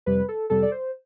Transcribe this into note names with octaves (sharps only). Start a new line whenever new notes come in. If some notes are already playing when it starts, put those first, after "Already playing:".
F2 C3 G3 B4
A4
F2 C3 G3 A4
D5
C5